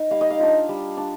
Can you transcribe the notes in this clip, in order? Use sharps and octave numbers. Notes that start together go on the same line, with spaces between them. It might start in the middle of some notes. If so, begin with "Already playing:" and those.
Already playing: D#4
G3 F5
D#5
F5
D4 F4
G3
D4 F4